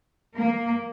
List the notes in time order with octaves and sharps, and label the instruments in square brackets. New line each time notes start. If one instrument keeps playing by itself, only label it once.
[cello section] A#3